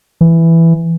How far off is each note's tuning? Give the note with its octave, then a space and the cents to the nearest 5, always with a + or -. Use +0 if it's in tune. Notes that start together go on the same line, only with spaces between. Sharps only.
E3 +5